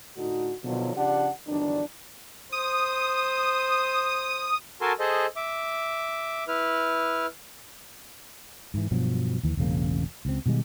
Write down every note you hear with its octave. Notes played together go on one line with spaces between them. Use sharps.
A2 D3 D#4 F#4
B2 D3 D#3 F3 F#3
C#3 F3 D4 G4 D5 F#5
G1 D#3 E3 F#3 D4
C5 D#6
F#4 A4 A#4 G#5 A5 C6
G#4 A4 C5 D#5
E5 D6
E4 B4 F6
G#2 E3
G2 B2 F3 F#3
D#2 E3
E1 A1 C#3 A#3
C#2 C4
B2 D#3 G3 G#3